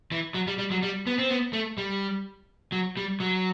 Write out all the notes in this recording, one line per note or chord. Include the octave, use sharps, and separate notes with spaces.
E3
F#3
G3
G3
F#3
G3
B3
C4
B3
A3
G3
F#3
G3
F#3